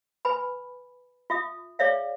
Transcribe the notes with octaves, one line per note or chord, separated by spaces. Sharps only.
B4 G#5 B5
F4 E5 D#6
G#4 C#5 D5 E5 F5